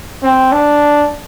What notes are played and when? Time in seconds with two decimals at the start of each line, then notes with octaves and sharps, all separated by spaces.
0.23 C4
0.52 D4